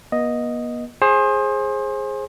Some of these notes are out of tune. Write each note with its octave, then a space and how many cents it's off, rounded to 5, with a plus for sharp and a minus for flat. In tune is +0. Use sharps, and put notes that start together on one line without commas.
B3 -45 D#5 +0
G#4 +0 C5 +30